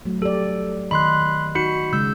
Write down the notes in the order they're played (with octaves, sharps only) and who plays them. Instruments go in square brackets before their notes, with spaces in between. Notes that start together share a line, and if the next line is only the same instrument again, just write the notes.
[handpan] F#3 A3
[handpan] G4 D5 [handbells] A4
[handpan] D#3 D#5 [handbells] B5 C6 F#6
[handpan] D#4 [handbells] F#4 B5 C#7
[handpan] C#3 G#3 [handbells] E6 G6